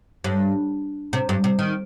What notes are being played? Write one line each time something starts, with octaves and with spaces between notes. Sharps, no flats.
G2
C3
G2
C3
D#3